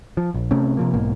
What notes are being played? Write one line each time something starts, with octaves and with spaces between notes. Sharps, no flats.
F3
A#1
C3 A3 C4 C#4
C3 F3 A#3
B1 G#2 B2 A#3